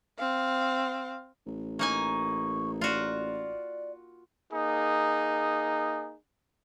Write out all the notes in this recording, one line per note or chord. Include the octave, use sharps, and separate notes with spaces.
C4 F5
A1
A#3 D#4 G#5 C#6
F4 F#4 D5
A#3 D#4 G#4